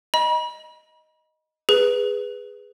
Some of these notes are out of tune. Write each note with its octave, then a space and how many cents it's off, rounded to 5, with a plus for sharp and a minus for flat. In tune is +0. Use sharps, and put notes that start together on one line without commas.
D#5 +0 B5 -45
G#4 -5 B4 +0